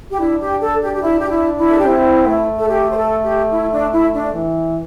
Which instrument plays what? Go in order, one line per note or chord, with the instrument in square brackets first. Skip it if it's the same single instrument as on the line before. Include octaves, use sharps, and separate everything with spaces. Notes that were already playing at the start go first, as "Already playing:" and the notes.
[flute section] G4
[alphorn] D4 [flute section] E4
[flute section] G4
A4
G4
G4
E4
G4
E4
E4
A4
G4
[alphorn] C4 [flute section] E4
[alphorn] A3
[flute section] A4
G4
C5
A4
G4
E4
D4
E4
D4
[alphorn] E3